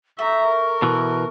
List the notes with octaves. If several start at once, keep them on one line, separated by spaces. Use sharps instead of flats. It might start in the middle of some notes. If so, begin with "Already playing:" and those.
A3 E5 A#5 C#6
A#4
B2 E3